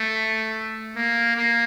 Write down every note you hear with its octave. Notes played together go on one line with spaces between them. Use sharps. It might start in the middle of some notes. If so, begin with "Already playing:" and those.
Already playing: A3
A#3
A#3